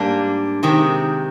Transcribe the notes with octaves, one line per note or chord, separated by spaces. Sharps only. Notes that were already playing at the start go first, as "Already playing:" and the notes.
Already playing: G#2 G3 A#3 D4
C3 D#3 G#3 C4